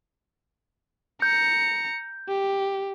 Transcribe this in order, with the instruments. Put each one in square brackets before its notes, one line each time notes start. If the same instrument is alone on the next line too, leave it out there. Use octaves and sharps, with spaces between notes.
[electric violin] A#5 C#7 [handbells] G6
[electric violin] G4